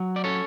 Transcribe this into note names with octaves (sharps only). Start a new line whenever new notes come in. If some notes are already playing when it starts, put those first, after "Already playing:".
Already playing: F#3
D5
C#4 A4 C#5